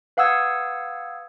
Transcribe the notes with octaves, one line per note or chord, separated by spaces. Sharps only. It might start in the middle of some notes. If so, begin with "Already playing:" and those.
B4 F5 F#5 D#6 E6 G#6